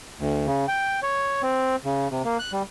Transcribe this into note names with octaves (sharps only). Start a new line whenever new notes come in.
D2
C#3
G5
C#5
C4
C#3
C3
A#3
F#6
G3